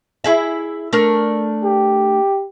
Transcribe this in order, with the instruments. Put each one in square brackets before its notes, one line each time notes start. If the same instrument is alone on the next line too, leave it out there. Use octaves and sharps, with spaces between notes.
[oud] E4 G#4 E5
A3 D4 A#4
[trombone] G4